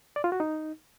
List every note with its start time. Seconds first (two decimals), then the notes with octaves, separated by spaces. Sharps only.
0.16 D5
0.24 F4
0.32 F#4
0.40 D#4